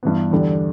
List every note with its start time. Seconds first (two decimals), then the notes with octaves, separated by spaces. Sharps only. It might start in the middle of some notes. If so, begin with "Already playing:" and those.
0.03 G2 E3 B3
0.31 E2 D3 G3